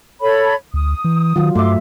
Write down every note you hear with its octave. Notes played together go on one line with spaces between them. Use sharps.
A4 C#5 B5
D2 D#6
E3
D#3 F#3 F4
G2 A3 E5 C6 D6